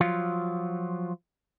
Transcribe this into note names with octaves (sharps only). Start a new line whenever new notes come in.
F3 F#3 F4